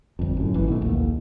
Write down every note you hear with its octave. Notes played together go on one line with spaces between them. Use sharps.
G1 F2
F#2 A2
G#1 E3
B2 D#3 A3
A#1 D#2